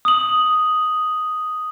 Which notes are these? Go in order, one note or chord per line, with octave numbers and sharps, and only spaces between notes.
D#6 F#7